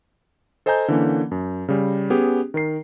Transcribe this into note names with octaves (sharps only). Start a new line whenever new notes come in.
A4 C5 D#5 G#5 A#5 G6
D3 E3 A#3 C#4
F#2
C#3 G3
B3 C#4 G4 G#4
D#3 A#4 C7